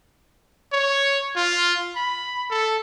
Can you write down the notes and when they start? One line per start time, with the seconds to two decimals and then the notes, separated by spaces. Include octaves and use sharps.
0.72 C#5
1.36 F4
1.96 B5
2.51 A4